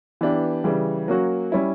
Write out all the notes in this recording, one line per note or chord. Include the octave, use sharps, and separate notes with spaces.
E3 B3 D4 G4
C#3 E3 G3
F#3 A#3 C#4 F#4
G3 C#4 E4